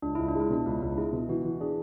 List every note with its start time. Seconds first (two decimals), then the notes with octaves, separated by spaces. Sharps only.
0.02 C#2 D4
0.15 C#2 E4
0.28 D4
0.35 G#3
0.40 E4
0.50 B2 D4
0.66 C#2
0.82 C#2
0.97 G#3 E4
1.13 B2
1.29 E3 F#4
1.45 E3
1.60 D4 G#4